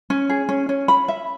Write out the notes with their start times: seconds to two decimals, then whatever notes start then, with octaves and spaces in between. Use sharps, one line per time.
0.10 C#4
0.30 G#4
0.49 C#4
0.69 C#4
0.88 B5
1.08 E5